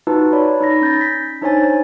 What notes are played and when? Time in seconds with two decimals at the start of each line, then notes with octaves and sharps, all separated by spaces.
0.07 D#4 F4 F#4 B4 A5
0.33 C#5 D5 B5
0.61 D#4 B5 A#6
0.82 C#4 G6 A6 A#6
1.01 B6
1.42 D4 D#4 C5 C#5 G#5 A6